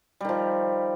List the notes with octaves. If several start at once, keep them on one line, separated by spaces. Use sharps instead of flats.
D#3 F3 G3